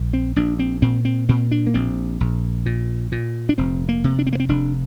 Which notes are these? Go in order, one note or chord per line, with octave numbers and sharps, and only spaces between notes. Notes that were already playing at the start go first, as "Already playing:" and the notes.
Already playing: A#1
C4
A#1 D4
C4
A#2 C4
C4
A#2 C4
D4
A#3
A#1 C4
A#1
A#2
A#2
D4
F1 C4
A#3
C3
D4
C4
A#3
C4
F1 D4